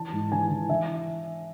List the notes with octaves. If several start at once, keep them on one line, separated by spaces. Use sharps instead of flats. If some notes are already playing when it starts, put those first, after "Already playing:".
Already playing: E3 A5
G#2
E3 G#5
E3
E3 E5